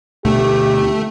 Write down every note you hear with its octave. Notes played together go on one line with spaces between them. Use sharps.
D2 B2 D3 A3 G4